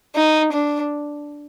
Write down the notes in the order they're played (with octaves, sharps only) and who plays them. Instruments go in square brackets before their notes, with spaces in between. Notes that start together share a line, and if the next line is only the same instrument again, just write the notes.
[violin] D#4
D4